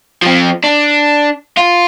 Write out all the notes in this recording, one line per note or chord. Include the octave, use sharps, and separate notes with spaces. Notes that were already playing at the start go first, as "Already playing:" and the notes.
F3 C4
D4
F4